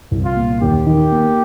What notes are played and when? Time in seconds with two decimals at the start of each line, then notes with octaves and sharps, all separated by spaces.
0.11 C2
0.24 F4
0.36 A#2
0.61 D#2 G4
0.86 D#3
1.11 A#3